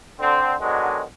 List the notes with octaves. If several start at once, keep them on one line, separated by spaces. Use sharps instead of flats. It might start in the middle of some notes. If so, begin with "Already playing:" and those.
D3 C4
B2 D3 D#3 F#3 G#3